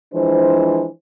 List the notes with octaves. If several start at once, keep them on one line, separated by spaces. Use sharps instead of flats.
E3 F3 G#3 D4 C5